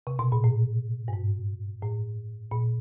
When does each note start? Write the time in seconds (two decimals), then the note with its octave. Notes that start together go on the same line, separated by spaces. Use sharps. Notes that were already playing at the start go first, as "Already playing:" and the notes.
0.07 C3
0.19 B2
0.32 A#2
0.44 A2
1.08 G2
1.13 G#2
1.82 A2
2.51 A#2